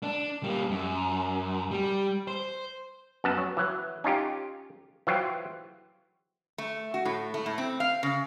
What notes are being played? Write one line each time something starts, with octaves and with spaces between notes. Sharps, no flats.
D4
G3 A#3
F#2
G3
C5
F#2 B3 A5
F#3
E3 F#3
C#4 D#4 F4 G4
E3 F#3 F4 C5 G5
A3
F#4
A2
A3
A2
C4
F5
C#3